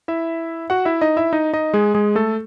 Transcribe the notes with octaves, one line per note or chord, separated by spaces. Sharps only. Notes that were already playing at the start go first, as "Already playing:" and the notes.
E4 E5
F#4 F#5
E4 E5
D#4 D#5
E4 E5
D#4 D#5
D#4 D#5
G#3 G#4
G#3 G#4
A3 A4